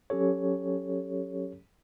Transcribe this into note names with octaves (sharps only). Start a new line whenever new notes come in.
F#3 C#4 G4 A4 C#5